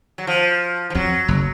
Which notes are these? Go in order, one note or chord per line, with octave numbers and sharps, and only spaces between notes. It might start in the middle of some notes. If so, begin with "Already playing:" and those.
F#3
F3
F3
F2 F#3
F#1